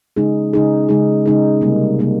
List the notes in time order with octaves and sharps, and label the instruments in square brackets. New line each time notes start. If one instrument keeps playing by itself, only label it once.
[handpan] C#3 G#3 D#4 G#4
C#3 G#3 D#4 G#4
C#3 G#3 D#4 G#4
C#3 G#3 D#4 G#4
C3 G3 A#3
C3 G3 A#3